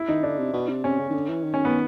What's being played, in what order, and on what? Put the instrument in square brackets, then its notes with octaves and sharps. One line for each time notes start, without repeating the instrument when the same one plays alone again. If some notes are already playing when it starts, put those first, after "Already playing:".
Already playing: [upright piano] E4
[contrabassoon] D#3 [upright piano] D#4
[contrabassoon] D3 [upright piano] D4
[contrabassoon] C3
B2
C3
[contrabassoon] C3 [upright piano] C#4
[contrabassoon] C#3
D#3
D3
E3
D#3
[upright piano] C#4
B3